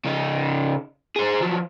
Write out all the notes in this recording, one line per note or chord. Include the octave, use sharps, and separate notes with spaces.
C#3 D#4
G#4 C5
F3 F#3